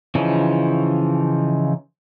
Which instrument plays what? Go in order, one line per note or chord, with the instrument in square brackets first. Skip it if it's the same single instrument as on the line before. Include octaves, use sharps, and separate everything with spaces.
[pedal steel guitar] C#3 E3 F3 C#4 D#4